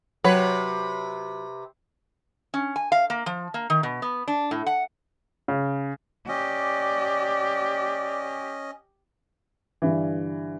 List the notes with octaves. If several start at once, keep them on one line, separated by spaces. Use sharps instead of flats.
C3 F#3 B4 C#5
C#4
G#5
F5
A#3
F3
A#3
D#3
B2
B3
D4
A2
F#5
C#3
C#4 G4 D5 D#5
G2 D3 E3